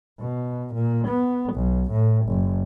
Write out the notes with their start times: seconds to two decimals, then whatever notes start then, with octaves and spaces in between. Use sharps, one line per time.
0.20 B2
0.75 A#2
1.08 B3
1.54 B1
1.91 A2
2.27 F#1